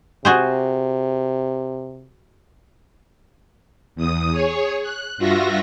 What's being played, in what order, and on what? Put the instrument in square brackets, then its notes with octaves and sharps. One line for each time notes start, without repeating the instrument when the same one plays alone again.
[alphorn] C3 [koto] F#4 G#4 C5
[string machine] E2 D#6
G#4 C#5
F#6
G2 F4 F#4 E5 A#6